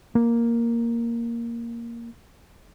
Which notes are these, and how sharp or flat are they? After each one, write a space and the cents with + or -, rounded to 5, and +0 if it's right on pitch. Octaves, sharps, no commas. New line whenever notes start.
A#3 +0